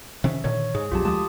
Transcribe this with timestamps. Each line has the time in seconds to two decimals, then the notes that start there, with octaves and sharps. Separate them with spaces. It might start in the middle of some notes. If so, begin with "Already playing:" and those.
0.24 C3 D#3 C#4 E5
0.44 A#2 D3 D#3 C#5
0.75 G#2 G#4
0.91 B1 F2 F#3 F4 G4 A5
1.05 D2 F3 G#3 A5 D#6